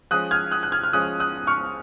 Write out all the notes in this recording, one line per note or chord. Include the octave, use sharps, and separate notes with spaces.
F3 G#3 C#4 D#6 F#6
F6 G#6
D#6 F#6
F#6
F6 G#6
F6
F3 G#3 C#4 D#6 F#6
D#6 F#6
C#6 F6